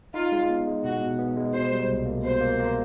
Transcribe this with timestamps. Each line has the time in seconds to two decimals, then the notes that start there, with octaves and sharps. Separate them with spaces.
0.14 D#4 F4
0.32 G#3
0.49 B3
0.67 G#3
0.84 B2 F#4
1.01 B2
1.19 B3
1.37 G#3
1.54 B2 C5
1.72 G3
1.89 C2
2.06 A#3
2.24 B2 C5
2.41 A#3
2.59 A#3